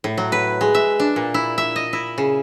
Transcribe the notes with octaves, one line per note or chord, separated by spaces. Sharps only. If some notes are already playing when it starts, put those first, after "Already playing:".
A2
F#3
B4
G#3
E5
D4
A#2
E4
E5
D#5
E4
C#3